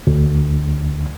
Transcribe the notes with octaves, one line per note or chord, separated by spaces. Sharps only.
D2